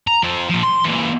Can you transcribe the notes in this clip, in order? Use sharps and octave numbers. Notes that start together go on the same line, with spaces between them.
A#5
F3 C4
A#2 F3
C6
A#2 E3